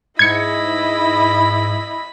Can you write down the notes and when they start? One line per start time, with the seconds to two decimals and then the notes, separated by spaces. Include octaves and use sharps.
0.19 G#2 E4 D#5 B5 G#6 C#7